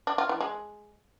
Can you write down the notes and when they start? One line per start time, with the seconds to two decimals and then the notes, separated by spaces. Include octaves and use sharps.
0.07 D4
0.18 F4
0.29 E3
0.41 G#3